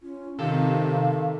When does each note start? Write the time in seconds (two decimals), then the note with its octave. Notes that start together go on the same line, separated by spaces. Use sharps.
0.03 C#4 F4
0.39 C3 D#3 A4 F5